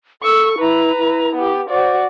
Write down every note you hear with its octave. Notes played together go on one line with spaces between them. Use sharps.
A4 C#6 E6
E4 B4 A#5
E4
B3 G4
F#4 C5 D5